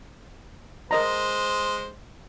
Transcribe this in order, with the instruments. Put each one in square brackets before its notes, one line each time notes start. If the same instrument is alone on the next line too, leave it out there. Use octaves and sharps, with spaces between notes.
[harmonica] G#3 C5 [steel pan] A#4 D#5 A#5